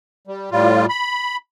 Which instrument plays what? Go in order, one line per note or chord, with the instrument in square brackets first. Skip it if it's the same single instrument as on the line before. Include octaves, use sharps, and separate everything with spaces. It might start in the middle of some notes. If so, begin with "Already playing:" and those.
[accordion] G3
A2 G3 F4
B5